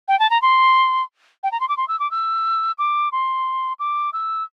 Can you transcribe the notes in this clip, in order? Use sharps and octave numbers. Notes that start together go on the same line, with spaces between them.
G5
A5
A#5
C6
G5
A#5
C6
D6
C6
E6
D6
E6
D6
C6
D6
E6